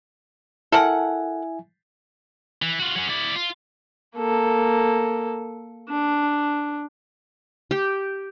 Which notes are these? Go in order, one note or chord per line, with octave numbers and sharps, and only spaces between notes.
E4 A4 A#4 E5 F#5 G#5
E3
F4 F#4
F#3 C#4
E4 D5
F4
A#3 A4
D4
G4